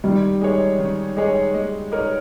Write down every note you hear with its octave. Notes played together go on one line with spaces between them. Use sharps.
D#3 G3
G#3 D#4 G#4 C#5
D#3
G#3 D#4 G#4 C#5
G#3
D#4 A#4 C#5